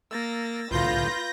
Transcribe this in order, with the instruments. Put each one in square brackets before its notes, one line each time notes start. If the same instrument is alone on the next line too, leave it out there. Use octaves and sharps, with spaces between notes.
[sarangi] A#3 [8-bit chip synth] E6 A6 A#6
[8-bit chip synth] C2 A2 D3 [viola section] F4 [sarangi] B4 [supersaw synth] G6 A#6